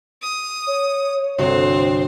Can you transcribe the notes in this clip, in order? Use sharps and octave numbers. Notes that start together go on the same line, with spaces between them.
D#6
C#5
G1 C2 C4 F#4 C5